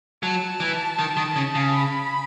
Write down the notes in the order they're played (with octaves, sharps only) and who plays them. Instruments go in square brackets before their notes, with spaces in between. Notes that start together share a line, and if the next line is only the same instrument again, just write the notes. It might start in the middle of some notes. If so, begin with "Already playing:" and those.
[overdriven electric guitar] F#3 [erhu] A5
[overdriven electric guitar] E3
D#3
D#3
C#3
C#3
[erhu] B5